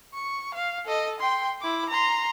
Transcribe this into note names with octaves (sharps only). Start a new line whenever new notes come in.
C#6
F5
A4 D#5
G5 C6
E4 D6
A#5 C6